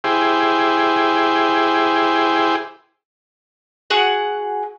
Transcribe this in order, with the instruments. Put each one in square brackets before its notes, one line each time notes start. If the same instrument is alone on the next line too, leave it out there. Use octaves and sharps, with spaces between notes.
[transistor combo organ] E4 G4 G#4 C5
[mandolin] F#4 G#4 F#5